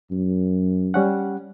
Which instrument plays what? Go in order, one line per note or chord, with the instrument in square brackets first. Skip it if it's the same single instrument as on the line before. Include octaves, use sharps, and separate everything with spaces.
[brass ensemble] F#2
[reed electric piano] G3 C#4 F#5